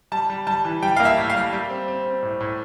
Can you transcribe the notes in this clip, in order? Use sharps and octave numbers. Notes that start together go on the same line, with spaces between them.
G3 A5
G3
G3 A5
E3
G3 G5
A#3 F5
E5
A2
G3 F5
G3
C4
C4
C4
A2
A2